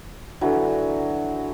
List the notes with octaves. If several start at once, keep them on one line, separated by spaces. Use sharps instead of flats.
D3 E3 F#3